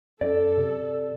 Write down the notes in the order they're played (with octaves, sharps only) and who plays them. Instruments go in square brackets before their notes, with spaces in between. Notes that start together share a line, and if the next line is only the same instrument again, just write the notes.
[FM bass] F#2 [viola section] A4 [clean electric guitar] D5
[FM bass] C3